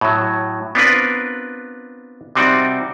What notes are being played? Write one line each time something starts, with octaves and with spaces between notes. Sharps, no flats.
A2 F#3
B3 C4 D4 F4 A#4 B4
C3 G3 C4 D#4 F#4 D5